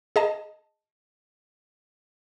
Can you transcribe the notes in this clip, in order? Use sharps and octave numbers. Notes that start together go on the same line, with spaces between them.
G#4 D#5 A5